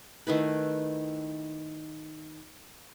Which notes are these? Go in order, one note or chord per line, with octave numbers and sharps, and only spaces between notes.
D#3 A3 E4 B4